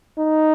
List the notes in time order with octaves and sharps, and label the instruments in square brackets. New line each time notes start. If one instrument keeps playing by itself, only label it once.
[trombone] D#4